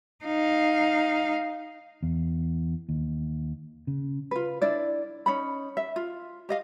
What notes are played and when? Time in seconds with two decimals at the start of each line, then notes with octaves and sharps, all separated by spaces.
0.25 D#4 F5
2.03 E2
2.89 D#2
3.87 C#3
4.31 F4 B4
4.62 D4 E4 D5
5.26 C#4 D#4 B5
5.77 E5
5.96 F4
6.49 G4 D#5 F5